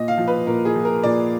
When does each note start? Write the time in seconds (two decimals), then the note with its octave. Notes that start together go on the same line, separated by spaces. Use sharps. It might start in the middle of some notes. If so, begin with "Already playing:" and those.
Already playing: A#2 D#5
0.08 F5
0.18 F3
0.28 B4
0.47 A#2 A#4
0.65 G#4
0.75 F3
0.85 A#4
1.03 A#2 D5